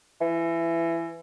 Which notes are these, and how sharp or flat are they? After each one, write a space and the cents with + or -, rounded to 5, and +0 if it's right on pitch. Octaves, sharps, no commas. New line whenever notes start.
E3 +20